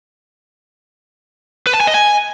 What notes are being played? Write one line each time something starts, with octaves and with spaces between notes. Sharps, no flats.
B4
A5
G#5
D#5
G#5